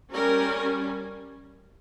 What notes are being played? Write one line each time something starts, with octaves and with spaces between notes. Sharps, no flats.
G3 C#4 A#4